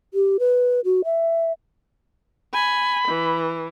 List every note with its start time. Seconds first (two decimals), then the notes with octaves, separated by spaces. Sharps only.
0.14 G4
0.40 B4
0.85 F#4
1.05 E5
2.53 G#5 B5
3.07 E3